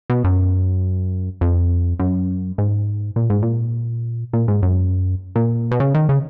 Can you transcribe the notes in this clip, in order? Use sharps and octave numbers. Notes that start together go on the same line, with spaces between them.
B2
F#2
F2
F#2
G#2
A#2
G#2
A#2
A#2
G#2
F#2
A#2
B2
C#3
D#3
C#3